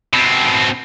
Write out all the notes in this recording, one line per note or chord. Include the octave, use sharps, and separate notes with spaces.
B2 C4